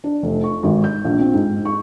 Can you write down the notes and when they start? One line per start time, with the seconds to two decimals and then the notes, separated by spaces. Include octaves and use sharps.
0.04 D4
0.23 F1
0.44 C#6
0.63 G#1
0.84 G6
1.05 A#1
1.19 C4
1.34 G#2
1.65 C#6